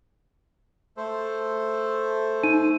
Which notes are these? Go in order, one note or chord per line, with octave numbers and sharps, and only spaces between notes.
A3 A4 C5
D#4 D#7